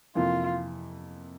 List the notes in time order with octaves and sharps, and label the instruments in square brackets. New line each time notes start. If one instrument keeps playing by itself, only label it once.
[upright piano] F2 C3 E3 A#3 [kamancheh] F4